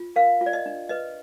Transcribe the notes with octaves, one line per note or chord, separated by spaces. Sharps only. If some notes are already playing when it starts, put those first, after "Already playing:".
Already playing: F4
A#4 F5
F4
D5
D#5
D4
B4 D#5